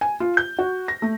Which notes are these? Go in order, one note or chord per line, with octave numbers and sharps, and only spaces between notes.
G#5
F4
G6
F#4
A#6
A3